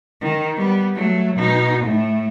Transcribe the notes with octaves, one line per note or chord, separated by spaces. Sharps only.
D#3
G3 B3
F#3 A3
B2 D#4
A2 A3